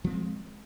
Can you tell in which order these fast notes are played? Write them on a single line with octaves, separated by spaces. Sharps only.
F3 B3 C4 G#3